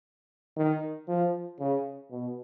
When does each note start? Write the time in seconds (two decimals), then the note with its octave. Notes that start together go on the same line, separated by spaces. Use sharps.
0.57 D#3
1.08 F3
1.60 C#3
2.11 B2